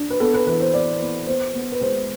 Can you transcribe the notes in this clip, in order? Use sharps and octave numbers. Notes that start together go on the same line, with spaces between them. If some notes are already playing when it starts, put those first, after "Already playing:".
Already playing: D4
B4
B3 A4
B4
E3 B4
C5
B3 D5
B3
B3 C5
B3
B4
G#3 C5